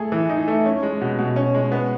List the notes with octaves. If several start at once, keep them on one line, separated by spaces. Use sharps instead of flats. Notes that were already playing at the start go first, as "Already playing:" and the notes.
Already playing: A3 G#4
E3
D#4
A3
C#4
G#3
B2
B2
C#4
G#3
B3